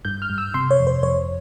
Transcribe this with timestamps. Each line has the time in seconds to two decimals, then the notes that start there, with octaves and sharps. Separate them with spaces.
0.05 G2 G6
0.22 F6
0.30 G2
0.38 E6
0.54 C3 C6
0.71 C#5
0.79 F2
0.87 C5
1.03 F2 C#5